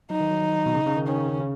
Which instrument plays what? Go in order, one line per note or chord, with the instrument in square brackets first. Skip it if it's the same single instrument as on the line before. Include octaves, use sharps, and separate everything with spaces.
[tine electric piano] F#3 [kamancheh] D#4
[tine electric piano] D#3
F#3
B2
C#3
C#3
D#3
[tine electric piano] D#3 [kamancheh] C#4
[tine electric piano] C#3
C#3
C#3